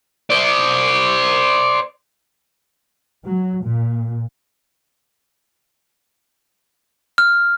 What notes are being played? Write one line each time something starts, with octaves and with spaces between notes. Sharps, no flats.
C5 D5
F#3
A#2
F6